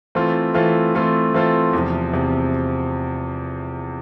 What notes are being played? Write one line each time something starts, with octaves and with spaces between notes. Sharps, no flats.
E3 A3 C4 F4 A4
E3 A3 C4 F4 A4
E3 A3 C4 F4 A4
E3 A3 C4 F4 A4
E2 C3 F3
E2 C3 F3